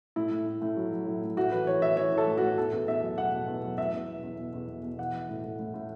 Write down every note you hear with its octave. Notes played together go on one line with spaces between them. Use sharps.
A2 E4
A2
A2
A2
F#3
F#3
A2
A2
A2 F#4
E3 B4
E3 C#5
E3 E5
E3 C#5
E3
A4
A2
F#4
A2
E2 A4
E2
E2 E5
F#3
B2 F#5
B2
E2
F#3
E2 E5
E2
B2
E2
B2
E2
B2
B2
E3 F#5
E3
A2
A2
A2
A2